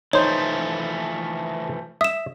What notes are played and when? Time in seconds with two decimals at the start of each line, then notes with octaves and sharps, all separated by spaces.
0.13 E3 F3 A3 D#4 C5 C#5
2.01 E5 D#6 E7